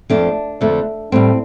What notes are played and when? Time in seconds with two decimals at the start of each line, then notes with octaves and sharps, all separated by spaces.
0.10 F2 F3 A3 D4
0.61 F2 D3 A3
1.12 A2 G3 C4